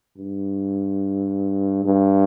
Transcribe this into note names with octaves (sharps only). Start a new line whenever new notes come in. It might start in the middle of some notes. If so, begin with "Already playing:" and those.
G2
G2